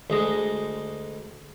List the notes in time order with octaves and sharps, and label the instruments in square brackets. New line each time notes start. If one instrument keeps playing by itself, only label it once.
[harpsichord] D2 G#3 D#5